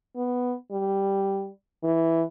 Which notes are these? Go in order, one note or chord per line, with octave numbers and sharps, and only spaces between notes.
B3
G3
E3